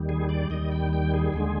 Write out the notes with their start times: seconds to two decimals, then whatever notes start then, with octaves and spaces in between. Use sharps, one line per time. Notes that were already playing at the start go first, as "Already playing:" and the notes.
Already playing: D#2 D#3 G3
0.09 G#4
0.29 D5
0.50 D#2 D#3 G3 D#5
0.71 G5
0.93 G5
1.14 G#4
1.34 D#2 D3 G#3